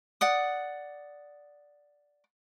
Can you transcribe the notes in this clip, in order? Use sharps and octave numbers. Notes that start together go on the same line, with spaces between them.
D5 F#5 D#6